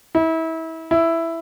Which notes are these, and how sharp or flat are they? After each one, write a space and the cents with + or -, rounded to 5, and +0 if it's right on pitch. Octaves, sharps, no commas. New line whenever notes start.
E4 -30
E4 +5